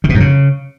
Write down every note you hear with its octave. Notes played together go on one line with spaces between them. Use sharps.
D#3
B2
F#2
C#3